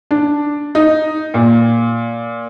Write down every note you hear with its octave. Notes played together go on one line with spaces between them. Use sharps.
D4
D#4
A#2